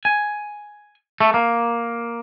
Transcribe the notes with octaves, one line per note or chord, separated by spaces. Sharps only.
G#5
A3
A#3